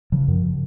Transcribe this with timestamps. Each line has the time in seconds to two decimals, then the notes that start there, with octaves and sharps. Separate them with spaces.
0.12 C#3 F3
0.28 F#2